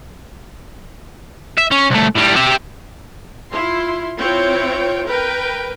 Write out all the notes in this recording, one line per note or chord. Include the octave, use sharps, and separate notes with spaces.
E5
C#4
C2 A3
A2 G3
G4 E5
E4 F4 C6
C4 E4 F4 C#5 G5
A#4 B4 G5